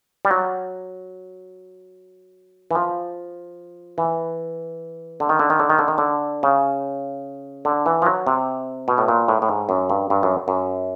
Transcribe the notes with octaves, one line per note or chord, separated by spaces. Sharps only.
G3
F#3
E3
F3
E3
D3
D#3
D3
D#3
D3
D#3
D3
D#3
D3
C#3
D3
E3
F3
F#3
C3
B2
A2
A#2
A2
A2
G#2
F#2
G2
G2
F#2
F#2